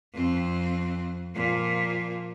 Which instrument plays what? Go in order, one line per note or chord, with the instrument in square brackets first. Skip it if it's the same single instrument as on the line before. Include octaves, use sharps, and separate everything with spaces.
[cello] F2 C4
A#2 F3